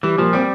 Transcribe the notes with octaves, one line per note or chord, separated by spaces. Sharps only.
E3 G3
A#2 F3
G3 C4